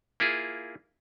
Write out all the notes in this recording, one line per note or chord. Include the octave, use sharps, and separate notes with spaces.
A#3 E4 F4 G#4